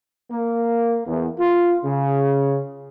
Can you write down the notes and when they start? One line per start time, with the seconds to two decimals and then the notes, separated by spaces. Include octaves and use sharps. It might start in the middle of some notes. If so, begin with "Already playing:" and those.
0.31 A#3
1.07 E2
1.39 F4
1.85 C#3